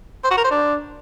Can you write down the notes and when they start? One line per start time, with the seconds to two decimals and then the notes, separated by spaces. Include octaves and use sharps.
0.24 C5
0.31 F#4
0.37 A#4
0.44 C5
0.51 D4